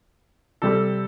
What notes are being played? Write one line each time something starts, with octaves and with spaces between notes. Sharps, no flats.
C3 G3 C4 A4